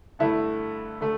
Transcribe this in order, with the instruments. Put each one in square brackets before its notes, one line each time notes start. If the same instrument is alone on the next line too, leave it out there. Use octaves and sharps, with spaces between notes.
[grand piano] G2 D3 A3 [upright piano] E4
[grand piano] D3 A3